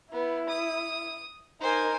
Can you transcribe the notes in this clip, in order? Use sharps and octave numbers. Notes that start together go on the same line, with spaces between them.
B3 E4
D#6
D#4 A#4 C5 G#5